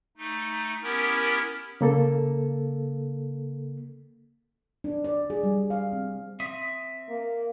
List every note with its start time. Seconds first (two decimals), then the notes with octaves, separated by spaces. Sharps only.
0.17 A3 D#4
0.83 B3 C#4 E4 G4 A#4
1.81 C#3 A#3 A4
4.84 D4
5.04 D5
5.30 G#4
5.43 G3
5.70 F5
5.93 C4
6.40 C4 E5 D#6
7.09 A#3